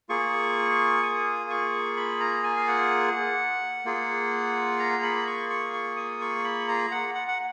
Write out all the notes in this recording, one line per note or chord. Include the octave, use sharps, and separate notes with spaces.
A#3 F4 G#4 C#6
D#6
C#6
B5
A#5
G#5
F5
F#5
A#3 F4 G#4
A#5
B5
C#6
C#6
C#6
D#6
C#6
B5
A#5
F#5
F#5
F#5